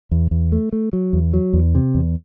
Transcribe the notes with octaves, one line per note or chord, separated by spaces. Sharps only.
E2
E2
A3
A3
F#3
E2
F#3
E2
C3
E2